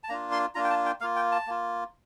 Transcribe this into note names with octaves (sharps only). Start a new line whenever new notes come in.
A5
A#3 D4 F4 A#5
C6
A#3 D4 F4 A#5
G5
A5
G5
A#3 F4 F5
G5
A5
A#3 F4